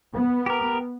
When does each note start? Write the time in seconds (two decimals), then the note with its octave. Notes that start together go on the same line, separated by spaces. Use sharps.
0.15 B3
0.46 G4 A#4